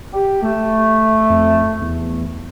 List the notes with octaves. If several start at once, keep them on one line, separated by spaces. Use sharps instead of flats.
G4
A3
F2
E2